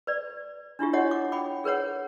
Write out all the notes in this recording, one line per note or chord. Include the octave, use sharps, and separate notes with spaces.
B4 D5
D4 E4 F4 G4
E4 F#4 C#5 D#5 F#5
D6
G5 B5 D6
G#4 A#4 B4 C#5 F#5